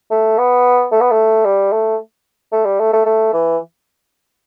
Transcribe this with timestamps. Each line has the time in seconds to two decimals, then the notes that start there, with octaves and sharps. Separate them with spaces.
0.11 A3
0.38 B3
0.92 A3
1.01 B3
1.11 A3
1.45 G3
1.72 A3
2.52 A3
2.65 G3
2.80 A3
2.93 A3
3.06 A3
3.33 E3